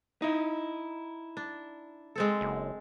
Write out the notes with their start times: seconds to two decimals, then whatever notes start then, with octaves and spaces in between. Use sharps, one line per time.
0.22 D#4 E4
1.37 D4
2.16 G#3 C4 A4
2.41 F#1